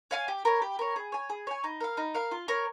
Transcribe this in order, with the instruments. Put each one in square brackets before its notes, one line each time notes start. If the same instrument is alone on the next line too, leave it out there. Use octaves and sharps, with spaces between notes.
[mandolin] C#5 F5 G#5
G4
A#4 C#5
G4
A#4 C#5
G#4
C#5 G#5
G#4
C#5 G#5
D#4
A#4 F5
D#4
A#4 F5
F4
A#4 C#5